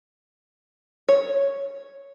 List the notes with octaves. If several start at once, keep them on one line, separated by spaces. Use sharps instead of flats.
C#5